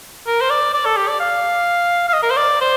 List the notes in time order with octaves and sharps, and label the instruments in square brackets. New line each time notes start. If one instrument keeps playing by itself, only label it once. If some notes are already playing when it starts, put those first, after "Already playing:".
[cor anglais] A#4
C5
D5
D5
A4
G4
D5
F5
F5
D#5
A#4
C5
D5
C5